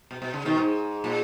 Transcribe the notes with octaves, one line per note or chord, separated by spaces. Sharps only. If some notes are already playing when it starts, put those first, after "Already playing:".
B2
B2
C#3
B2 D#3
G#2
A#2